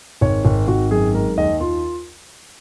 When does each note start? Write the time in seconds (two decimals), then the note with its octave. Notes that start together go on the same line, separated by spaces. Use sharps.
0.21 G#1 C#5
0.45 G#1
0.68 G#1 F#4
0.91 F#2 G#4
1.14 G#3 A#4
1.37 D#2 D#5
1.60 D#2 F4